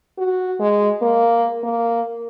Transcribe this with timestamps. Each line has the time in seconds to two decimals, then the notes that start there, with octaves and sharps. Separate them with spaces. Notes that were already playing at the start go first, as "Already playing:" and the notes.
0.18 F#4
0.60 G#3
1.02 A#3
1.64 A#3